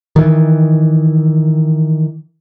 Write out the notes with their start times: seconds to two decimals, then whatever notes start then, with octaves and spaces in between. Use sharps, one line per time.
0.16 D#3 E3